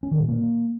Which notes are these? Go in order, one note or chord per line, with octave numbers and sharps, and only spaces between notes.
C#4
D#3
A#2
A#3